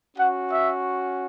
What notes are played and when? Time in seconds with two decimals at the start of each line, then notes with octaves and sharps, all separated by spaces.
0.17 C#4 F#4 F#5
0.50 E5